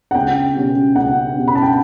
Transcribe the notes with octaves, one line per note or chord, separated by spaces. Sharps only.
F#5
C#2 G5
B2 G3 C#4
C#2 F#5
B2 G3 C#4
B5
A5
G5